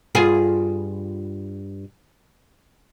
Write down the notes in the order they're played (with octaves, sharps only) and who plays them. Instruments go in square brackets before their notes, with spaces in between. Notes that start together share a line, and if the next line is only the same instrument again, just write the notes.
[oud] G2 F4 G#4